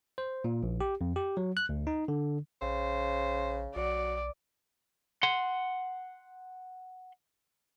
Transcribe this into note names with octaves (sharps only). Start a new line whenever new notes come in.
C5
A#2
A#1
G4
F2
G4
F#3
F#6
D2
D#4
D3
A#1 C#3 C5
B1 F#3 D5
F#5 C6